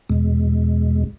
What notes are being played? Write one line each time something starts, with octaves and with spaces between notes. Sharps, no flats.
E2 B2 G#3